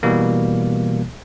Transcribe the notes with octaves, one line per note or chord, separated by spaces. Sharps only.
B2 E3 G3 A#3